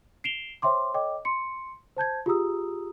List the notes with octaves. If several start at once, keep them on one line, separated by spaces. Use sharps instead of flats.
C7 D7 E7 F7 G7
C5 C#5 E5 G5 C6 D6
A4 C#5 D#5 G5 D6
C6 C#7
C5 A5 G6 G#6
F4 G4 G#4 A#5 D#6 E6